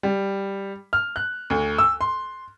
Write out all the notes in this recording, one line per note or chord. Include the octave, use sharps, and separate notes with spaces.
G3
F6
F#6
D2
E6
C6